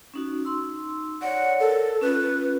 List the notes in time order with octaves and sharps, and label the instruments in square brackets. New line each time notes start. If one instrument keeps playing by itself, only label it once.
[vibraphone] C#4 D#4 F#4
D#4 C6 E6
[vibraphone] C#5 D5 [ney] F#5
[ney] A4 [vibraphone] A#4
[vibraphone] C#4 F4 [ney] B4